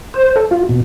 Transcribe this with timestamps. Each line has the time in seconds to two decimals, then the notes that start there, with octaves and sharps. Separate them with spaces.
0.14 C5
0.36 A4
0.51 F4
0.69 B2